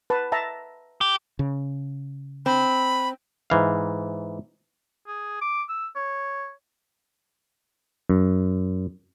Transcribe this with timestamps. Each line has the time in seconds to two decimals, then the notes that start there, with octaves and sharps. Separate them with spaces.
0.10 B4 A5
0.32 E5 A5 A#5
1.01 G4
1.39 C#3
2.46 C4 B5
3.50 G#2 E3 F5
5.08 G#4
5.42 D6
5.69 E6
5.96 C#5
8.10 F#2